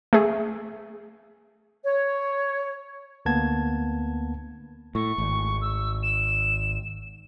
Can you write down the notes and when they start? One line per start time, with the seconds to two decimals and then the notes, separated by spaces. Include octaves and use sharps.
0.13 A3 G#4
1.85 C#5
3.25 D2 A#3 B3 A5 G#6
4.95 A2 C#6
5.18 G#1
5.62 E6
6.03 E7